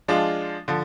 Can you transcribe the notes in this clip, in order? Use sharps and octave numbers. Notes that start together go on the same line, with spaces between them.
F3 G#3 D4 F4
D3 F3